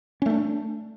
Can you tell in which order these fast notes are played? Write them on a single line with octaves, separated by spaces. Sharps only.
C#4 A3 D4